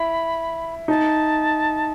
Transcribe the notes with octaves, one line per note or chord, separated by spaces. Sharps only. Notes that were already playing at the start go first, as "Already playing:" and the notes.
Already playing: E4 B5
D#4 A5